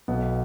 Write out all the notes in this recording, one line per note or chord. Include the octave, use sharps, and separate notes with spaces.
B1 B2 B3